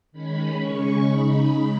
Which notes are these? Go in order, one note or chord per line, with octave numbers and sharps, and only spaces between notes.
D#3 G#3 C#4 B5
C#3 G#3 C#4 C#6
C#3 G#3 D#4 B5